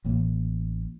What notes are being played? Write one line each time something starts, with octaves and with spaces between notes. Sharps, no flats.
A1 A2 E3 A#3